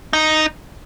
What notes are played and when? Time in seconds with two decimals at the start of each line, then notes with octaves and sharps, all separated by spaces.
0.13 D#4